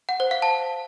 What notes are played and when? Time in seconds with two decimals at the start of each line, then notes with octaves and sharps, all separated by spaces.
0.09 F#5
0.20 C5
0.31 F5
0.42 A5